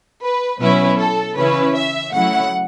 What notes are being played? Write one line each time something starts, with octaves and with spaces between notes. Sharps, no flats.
B4
B2 F#3 C#4 E4 B4
A4
C#3 E3 C#4 E4 B4
E5
C#3 F#3 A3 E4 F#5